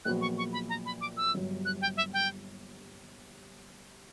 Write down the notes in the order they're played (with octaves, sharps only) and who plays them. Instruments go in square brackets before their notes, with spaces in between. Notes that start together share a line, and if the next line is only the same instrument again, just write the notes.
[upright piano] A#1 A#2 F#3 B3 F#4 [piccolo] F#6
[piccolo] C#6
C#6
B5
A#5
B5
D6
E6
[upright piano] G1 G2 F#3
[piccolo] F#6
G5
E5
G5